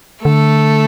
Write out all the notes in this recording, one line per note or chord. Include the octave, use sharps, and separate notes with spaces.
D3 A3 A4